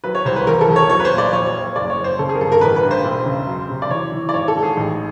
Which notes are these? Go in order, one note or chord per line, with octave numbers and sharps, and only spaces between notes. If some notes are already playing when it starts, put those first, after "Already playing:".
F#3 B4
C#5
C2 C5
B4
E2 A#4
A4
E2
C#5
F#3 C#5
B4
C5
A#2
D5
F2 C#5
C#5
F2
C#5
F#1 D5
C#5
F#1
C5
C#3 A4
G#4
A#4
G1 A4
A#4
A1 B4
B4
G2
C5
E1
C#3
F#3
C3
D5
E3 C#5
E3
D5
G#1 C#5
A4
G#2
G#4
A1